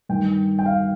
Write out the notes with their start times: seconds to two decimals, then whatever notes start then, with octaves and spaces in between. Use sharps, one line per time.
0.09 G2 D#3 G5
0.59 G5
0.66 F5